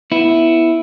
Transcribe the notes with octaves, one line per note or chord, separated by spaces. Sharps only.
B3 E4